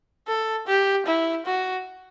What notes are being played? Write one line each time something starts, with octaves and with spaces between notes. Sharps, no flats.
A4
G4
E4
F#4